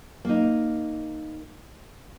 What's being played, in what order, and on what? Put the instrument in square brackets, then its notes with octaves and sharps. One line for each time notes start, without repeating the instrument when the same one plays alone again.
[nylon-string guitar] A#3 D#4